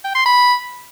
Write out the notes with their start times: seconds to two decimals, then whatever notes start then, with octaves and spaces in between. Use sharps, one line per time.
0.04 G5
0.15 C6
0.26 B5